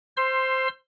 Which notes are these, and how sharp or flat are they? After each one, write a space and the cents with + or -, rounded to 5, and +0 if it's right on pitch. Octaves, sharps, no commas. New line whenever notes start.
C5 +0 C6 +10 E6 +35